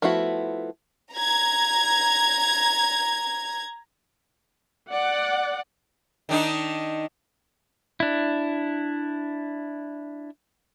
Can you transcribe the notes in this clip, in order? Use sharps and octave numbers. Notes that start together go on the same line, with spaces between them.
F3 A3 B3 E4 F#4
A#5 G#6
D5 F#5
D#3 D4 D#4
D4 E4